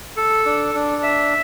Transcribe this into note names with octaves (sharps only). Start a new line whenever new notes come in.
A4
D4
D4
E5